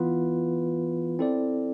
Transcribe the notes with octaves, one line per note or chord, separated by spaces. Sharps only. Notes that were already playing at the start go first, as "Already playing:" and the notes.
Already playing: E3 B3 F4 B4
C4 E4 A4 D5